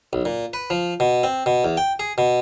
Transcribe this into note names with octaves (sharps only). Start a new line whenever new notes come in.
B1
A#2
B4
F3
B2
C4
B2
E2
G5
G#4
B2